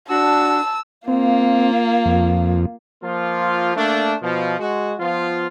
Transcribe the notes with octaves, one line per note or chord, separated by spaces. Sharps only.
D4 F#4 A5 E6
A#3 C4 F4
F2
F3 A#3 F4
A3 A#3 D4
B2 F3
G#3 F#4
F3 B3 F4